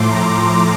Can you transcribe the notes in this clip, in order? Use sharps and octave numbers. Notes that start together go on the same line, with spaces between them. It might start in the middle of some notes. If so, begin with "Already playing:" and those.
Already playing: A2 F3 A3 C6 D6
A#5 C6